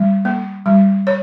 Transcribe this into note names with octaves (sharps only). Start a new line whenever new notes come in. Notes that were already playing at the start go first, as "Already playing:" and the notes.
Already playing: G3
A#3
G3
C#5